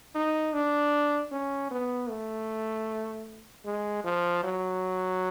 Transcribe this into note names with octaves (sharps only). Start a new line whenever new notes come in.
D#4
D4
C#4
B3
A3
G#3
F3
F#3